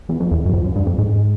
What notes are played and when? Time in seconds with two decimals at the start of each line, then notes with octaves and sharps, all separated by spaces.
0.09 E2
0.20 F2
0.31 E2
0.45 F#2
0.53 F2
0.64 F#2
0.76 G2
0.87 F2
0.98 G#2